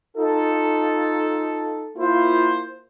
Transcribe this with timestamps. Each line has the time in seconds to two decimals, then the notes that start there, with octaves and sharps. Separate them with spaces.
0.17 D#4 F4 A4
1.97 A#3 E4 F4 C5